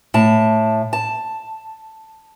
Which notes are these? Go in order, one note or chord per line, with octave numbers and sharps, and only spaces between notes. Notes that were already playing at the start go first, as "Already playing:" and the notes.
A2 A5
A5